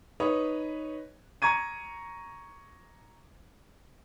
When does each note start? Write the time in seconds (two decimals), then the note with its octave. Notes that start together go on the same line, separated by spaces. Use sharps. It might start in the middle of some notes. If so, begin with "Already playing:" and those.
0.20 D#4 B4 C#5 D#6
1.42 A#5 C#6 G#6 D#7